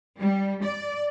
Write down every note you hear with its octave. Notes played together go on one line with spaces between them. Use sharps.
G3
D5